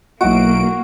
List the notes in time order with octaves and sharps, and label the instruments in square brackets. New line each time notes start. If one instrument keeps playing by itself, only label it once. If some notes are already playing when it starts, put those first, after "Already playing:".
[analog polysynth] B1 D7 [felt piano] F#3 E4 D#5 [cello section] A#3 [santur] F#4